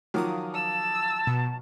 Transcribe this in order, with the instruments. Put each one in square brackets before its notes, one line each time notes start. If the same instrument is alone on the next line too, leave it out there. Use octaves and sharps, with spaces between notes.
[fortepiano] D#3 F3 F#3 [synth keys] F5 D6 D#6
[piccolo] A5 [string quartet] E6
[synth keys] B2